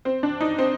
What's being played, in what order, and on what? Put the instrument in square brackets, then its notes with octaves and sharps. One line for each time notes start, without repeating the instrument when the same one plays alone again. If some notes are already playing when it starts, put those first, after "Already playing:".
[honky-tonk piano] C4
D4
D#4
C4